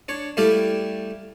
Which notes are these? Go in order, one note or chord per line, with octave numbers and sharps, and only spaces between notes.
D4 C#5
G3 A3 E4 G4 D5 F5